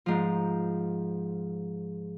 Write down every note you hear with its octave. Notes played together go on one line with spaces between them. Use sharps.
G#2 F3